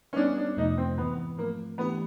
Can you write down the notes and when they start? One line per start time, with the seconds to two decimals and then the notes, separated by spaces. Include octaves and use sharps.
0.13 C#4
0.16 G3 B3 D4 D#4
0.38 D4
0.57 F2 C3 F3 A3 D#4
0.77 C4
0.98 G#2 E3 G#3 B3
1.37 G#2 F3 A3 A#3 C4
1.78 E3 A3 B3 D4 G4